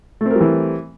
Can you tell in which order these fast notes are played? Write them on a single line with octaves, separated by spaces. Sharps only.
A3 C4 A#4 G3 E3